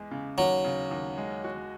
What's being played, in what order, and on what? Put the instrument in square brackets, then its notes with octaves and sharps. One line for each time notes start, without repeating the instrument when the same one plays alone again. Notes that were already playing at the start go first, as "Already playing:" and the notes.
Already playing: [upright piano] E2 G#3
C#3
[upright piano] D#2 [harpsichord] F#3
[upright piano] C#3
D#2
G#3
F#4